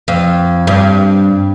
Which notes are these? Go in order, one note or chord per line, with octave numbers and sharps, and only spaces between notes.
F2
G2